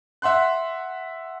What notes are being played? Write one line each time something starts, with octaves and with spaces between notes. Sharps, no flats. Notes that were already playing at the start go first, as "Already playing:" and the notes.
E5 F#5 C6 F#6